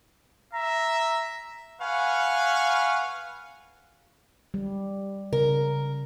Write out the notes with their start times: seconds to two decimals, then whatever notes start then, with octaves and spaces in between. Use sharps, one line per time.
0.53 E5 A#5
1.82 B4 F5 F#5 G#5 C#6
4.54 G3
5.33 C#3 A#4